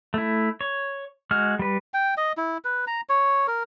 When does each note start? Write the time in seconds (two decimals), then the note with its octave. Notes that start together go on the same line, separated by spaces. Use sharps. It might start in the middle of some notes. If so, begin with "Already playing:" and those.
0.14 A3 E4
0.61 C#5
1.31 G#3 F#4 F6
1.59 G3 B4
1.94 G5
2.17 D#5
2.37 E4
2.65 B4
2.87 A#5
3.09 C#5
3.47 A#4